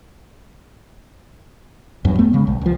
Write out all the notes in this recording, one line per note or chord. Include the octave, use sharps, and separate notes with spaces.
E2 G2 F#3
G1 A3 B3
G1 C#3 G#3
B1
C2 F3